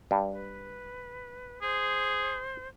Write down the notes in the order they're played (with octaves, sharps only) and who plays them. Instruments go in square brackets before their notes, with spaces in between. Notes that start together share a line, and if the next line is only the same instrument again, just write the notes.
[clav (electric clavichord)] G2
[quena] B4
[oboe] G#4 [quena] C5